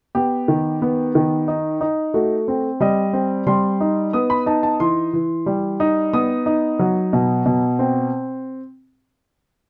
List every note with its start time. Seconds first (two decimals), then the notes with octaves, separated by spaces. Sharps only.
0.15 B3 G4
0.48 D#3
0.82 B3
1.15 D#3
1.48 D#4
1.81 D#4
2.14 A3 F#4
2.48 C4
2.80 G3 D#5
3.13 C4
3.47 G3 C6
3.81 D#4
4.13 B3 D#6
4.30 B5
4.46 D#4 A5
4.63 A5
4.80 E3 C6
5.13 E3
5.46 G3
5.80 D#4
6.13 B3 D#6
6.46 D#4
6.79 F#3
7.13 B2
7.46 B2
7.79 C4